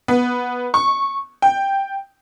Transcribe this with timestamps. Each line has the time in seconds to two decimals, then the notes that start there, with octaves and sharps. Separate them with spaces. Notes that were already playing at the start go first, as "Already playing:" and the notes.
0.08 B3
0.74 C#6
1.42 G5